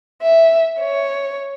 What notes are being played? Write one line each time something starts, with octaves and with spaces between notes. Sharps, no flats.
E5
C#5